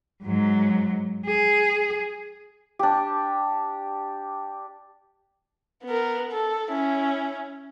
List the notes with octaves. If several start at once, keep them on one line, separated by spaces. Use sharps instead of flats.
G#2 F#3
G#4
D4 G4
B3 A#4
A4
C#4 E4